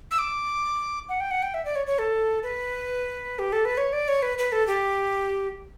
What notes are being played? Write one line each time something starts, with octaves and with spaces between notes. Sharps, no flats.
E6
D6
F#5
G5
F#5
G5
E5
D5
C#5
C#5
A4
B4
G4
A4
B4
C#5
D5
C#5
B4
B4
A4
G4